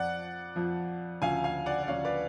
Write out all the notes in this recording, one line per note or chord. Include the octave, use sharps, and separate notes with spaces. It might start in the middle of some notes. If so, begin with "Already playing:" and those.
Already playing: F2 F3 D5 F#5
F2 F3
D2 C#3 F3 F5 G#5
F5 G#5
D5 F#5
D5
D2 C#3 F3 C#5 F5
B4 D5